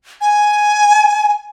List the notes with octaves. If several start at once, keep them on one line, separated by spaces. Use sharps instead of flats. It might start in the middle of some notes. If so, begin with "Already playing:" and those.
G#5